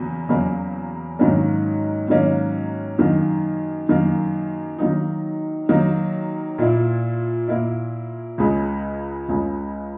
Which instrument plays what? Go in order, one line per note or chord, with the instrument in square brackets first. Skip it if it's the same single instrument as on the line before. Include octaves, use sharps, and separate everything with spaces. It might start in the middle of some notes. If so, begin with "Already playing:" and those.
Already playing: [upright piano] E2 C#3 F#3 A#3
E2 C#3 F#3 A#3
G#2 D#3 F#3 A#3 C#4
G#2 D#3 F#3 A#3 C#4
F#2 D#3 A#3
F#2 D#3 A#3
D#3 F#3 A#3 D#4
D#3 F#3 A#3 D#4
A#2 A#3 E4
A#2 A#3 E4
C#2 C#3 G#3
C#2 C#3 G#3